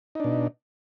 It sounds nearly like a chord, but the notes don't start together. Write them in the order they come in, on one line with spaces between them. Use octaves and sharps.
D#4 D4 B2